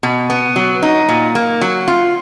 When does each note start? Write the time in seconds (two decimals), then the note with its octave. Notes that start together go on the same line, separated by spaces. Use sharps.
0.03 B2
0.30 B3
0.56 F#3
0.82 D#4
1.08 A#2
1.35 A#3
1.61 F#3
1.88 F4